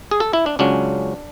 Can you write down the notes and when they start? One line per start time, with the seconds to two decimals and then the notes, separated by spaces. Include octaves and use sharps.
0.11 G#4
0.20 A4
0.33 E4
0.46 D4
0.59 C#2 C#3 F#3 C#4 D4